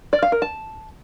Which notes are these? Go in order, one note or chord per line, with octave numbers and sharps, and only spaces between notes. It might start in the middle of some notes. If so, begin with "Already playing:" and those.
D5
F5
A#4
A5